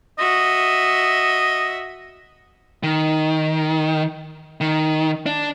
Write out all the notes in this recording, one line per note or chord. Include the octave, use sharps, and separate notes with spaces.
F#4 D#5 E5
D#3
D#3
D4